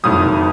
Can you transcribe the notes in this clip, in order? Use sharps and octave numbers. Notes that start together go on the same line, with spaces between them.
F#1 F2 D#3 F#3 D#6